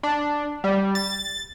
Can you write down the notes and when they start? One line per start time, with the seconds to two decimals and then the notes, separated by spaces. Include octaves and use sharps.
0.03 D4
0.64 G3
0.95 A6